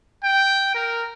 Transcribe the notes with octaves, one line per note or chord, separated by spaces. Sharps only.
G5
A#4